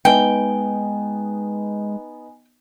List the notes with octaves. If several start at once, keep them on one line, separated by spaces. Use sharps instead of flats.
G#3 B3 D#4 G5 G#5